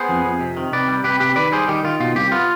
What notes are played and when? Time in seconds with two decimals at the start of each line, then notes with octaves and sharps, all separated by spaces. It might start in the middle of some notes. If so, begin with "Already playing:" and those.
Already playing: B3 G#4 C5
0.09 F2
0.25 F2
0.41 C3
0.57 D#3
0.72 C3 B4 D5
0.88 G3
1.04 C3 G4 B4
1.20 C3 G4 B4
1.36 D#3 B4 D5
1.52 G3 G#4 C5
1.68 D#3 G4
1.84 D#3 F4
2.00 B2 F4
2.16 C2 G4
2.32 B3 F4